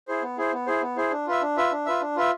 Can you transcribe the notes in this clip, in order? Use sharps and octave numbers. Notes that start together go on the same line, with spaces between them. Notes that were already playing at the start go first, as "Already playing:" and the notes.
E4 G#4 C5
B3
E4 G#4 C5
B3
E4 G#4 C5
B3
E4 G#4 C5
D4
F4 B4 E5
D4
F4 B4 E5
D4
F4 B4 E5
D4
F4 B4 E5